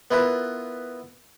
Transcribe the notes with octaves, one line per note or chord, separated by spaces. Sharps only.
B3 E4 F4 A#4 B4